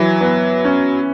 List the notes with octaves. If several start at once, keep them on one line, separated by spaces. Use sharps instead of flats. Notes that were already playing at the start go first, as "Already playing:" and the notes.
Already playing: E3 F#3 E4
B3
C#4